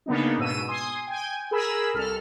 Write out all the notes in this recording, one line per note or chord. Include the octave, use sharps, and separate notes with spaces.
C#3 A#3 B3 D4 D#4
G#2 B2 E6 D#7
G#5 C6 D#6
G5 G#5
G#4 A#4 B5 E6
C2 A4 F6